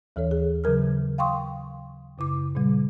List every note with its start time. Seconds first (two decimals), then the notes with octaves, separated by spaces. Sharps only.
0.16 D#2 E3 A4 C#5
0.31 G#4
0.64 C#3 F#3 A#4 F6
1.18 F5 G5 C6 C#6 D#6
2.18 F#2 C#3 E4 D6
2.55 A#2 C#3 G3